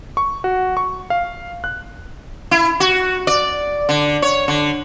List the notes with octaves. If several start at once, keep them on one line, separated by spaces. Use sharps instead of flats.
C#6
F#4
C#6
F5
F#6
E4
F#4
D5
D3
C#5
D3